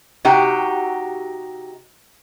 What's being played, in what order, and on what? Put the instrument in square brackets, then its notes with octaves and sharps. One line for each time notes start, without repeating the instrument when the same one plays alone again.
[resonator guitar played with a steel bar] C3 D#4 F#4 G4